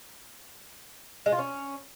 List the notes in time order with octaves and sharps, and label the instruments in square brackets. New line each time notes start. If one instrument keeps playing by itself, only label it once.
[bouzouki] G#3
F4
C#4